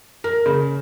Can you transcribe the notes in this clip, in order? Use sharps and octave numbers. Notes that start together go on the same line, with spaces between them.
A#4
C#3